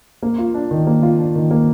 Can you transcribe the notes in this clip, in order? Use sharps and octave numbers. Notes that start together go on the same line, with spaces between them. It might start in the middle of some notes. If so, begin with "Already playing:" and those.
A#3
F4
D4
D#3
A#3
F4
D4
D#3
A#3